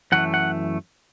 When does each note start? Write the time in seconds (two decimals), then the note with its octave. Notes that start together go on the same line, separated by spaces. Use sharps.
0.12 F#2 E3 A3 F#5
0.34 F#5